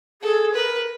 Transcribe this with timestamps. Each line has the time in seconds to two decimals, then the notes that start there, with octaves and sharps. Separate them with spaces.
0.22 G#4 A4
0.54 A#4 B4